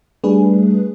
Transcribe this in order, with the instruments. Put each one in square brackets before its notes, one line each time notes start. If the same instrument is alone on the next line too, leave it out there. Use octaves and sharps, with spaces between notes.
[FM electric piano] G3 A3 D4 G#4 B4